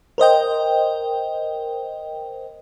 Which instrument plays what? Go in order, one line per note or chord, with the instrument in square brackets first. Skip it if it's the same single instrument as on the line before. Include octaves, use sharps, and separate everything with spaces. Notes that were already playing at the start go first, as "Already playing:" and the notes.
[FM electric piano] A#4 C5 D#5 G5